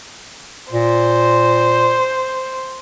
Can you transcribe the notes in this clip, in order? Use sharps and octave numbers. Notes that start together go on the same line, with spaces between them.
A#2 C5